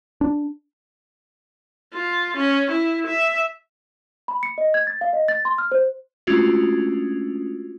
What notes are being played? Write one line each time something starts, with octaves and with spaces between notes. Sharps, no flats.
D4
F4
C#4
E4
E5
B5
C#7
D#5
G#6
A6
F5
D#5
A6
C6
F6
C5
G#3 A3 C#4 D4 F4 F#4